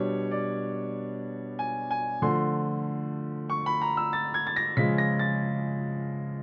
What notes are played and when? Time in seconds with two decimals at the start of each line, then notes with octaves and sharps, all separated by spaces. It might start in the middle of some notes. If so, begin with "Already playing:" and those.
Already playing: B2 G3 B3 D4 C#5
0.31 D5
1.59 G#5
1.91 G#5
2.22 D3 F3 A3 C6
3.50 C#6
3.66 B5
3.81 A#5
3.97 E6
4.13 A6
4.34 G#6
4.47 A6
4.56 A#6
4.77 C#3 F3 G#3 B6
4.98 A#6
5.19 A6